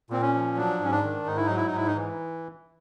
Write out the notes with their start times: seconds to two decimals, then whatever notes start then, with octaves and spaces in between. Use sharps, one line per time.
0.10 A#2 C4
0.21 C#4
0.33 F3
0.57 F#3 D4
0.79 G#2 C#4
0.91 D4
1.03 D#3
1.26 G#2 D#4
1.37 E4
1.46 F#3 D#4
1.56 E4
1.67 D#4
1.73 G#2 E4
1.87 D#4
1.95 E3